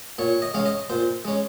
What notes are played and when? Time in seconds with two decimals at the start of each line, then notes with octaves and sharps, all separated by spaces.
0.19 A#2 C#5
0.42 D#5
0.54 G#3 C#4 F5
0.66 D#5
0.90 A#2 C5
1.25 G#3 C#4